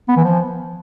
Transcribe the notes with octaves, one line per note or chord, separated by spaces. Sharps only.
B3
E3
F3